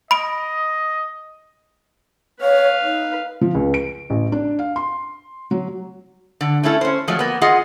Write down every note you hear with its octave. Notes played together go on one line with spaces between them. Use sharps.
D#5 B5 D7
B4 C#5 F5
D#4
F3
C#2
D7
A1
D4
F5
C6
F#3
D3
A3 C#4 E4 A4
C#4 C5
F3 F#3 G#3 A3
A#3 B3
F4 G#4 D#5 F#5